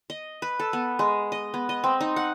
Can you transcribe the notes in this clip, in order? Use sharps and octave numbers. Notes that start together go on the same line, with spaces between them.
D#5
B4
A4
B3
G#3
D#5
B3
D#5
C4
D#4
F#5